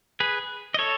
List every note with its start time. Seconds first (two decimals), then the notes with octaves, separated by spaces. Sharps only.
0.20 G#4 B4
0.74 D#5
0.79 A4 C#5